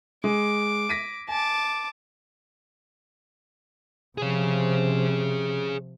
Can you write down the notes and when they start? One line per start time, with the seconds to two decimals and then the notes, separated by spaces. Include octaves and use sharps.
0.24 G#3 D6
0.89 A#6 B6 D#7
1.28 G#5 A5 D6
4.18 C3 F3 G#4 C#5